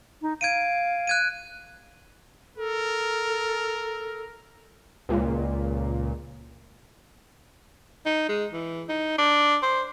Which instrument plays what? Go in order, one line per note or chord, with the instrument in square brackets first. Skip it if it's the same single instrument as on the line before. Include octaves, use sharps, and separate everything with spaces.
[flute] D#4
[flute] F5 [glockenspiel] G#6 D7 D#7
[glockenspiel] F#6 G#6 D#7
[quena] A4 [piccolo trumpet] A#4
[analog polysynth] C#2 A#2
[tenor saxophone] D#4
G#3
E3
D#4
D4
C5